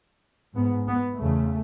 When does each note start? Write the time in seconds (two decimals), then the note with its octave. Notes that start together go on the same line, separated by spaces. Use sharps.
0.55 G#2 B3
0.88 B3
1.20 E2 C#3 A3